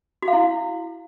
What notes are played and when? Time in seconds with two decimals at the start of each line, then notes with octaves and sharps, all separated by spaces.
0.22 F#4
0.28 F5
0.33 E4